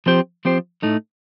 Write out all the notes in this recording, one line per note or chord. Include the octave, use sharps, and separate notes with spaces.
F3 C4 G4 C5
F3 C4 G4 C5
A2 A3 D#4